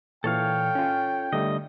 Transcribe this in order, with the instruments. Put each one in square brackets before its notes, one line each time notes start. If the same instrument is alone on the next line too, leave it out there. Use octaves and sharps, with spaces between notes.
[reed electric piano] A#2 E3 [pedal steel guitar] A4 C#5 F5 [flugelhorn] G5
[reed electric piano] C#4 F4
[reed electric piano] D3 G3 A3 [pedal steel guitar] D#5